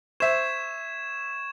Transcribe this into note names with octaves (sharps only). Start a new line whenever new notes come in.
C5 E5 C#6 G#6 E7